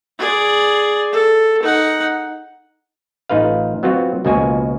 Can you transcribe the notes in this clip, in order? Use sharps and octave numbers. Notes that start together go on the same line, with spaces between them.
G#4 D5
A4
D#4 F#5
A1 D#4 F4 B4 F5
F#3 B3 C4 F4 F#4
C#2 B2 F3 A#3 F#4 G#5